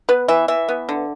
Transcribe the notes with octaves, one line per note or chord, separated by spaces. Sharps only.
B3 B4
E3 E5
E3 E5
B3
D3